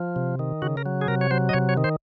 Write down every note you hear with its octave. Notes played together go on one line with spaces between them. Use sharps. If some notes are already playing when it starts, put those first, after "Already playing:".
Already playing: F3
C3
D#3
C#3 F#4
A#4
F#3
G#4
C3 A#4
C#5
F#3 C5
D#5
C3 C#5
C#5
D#3
C5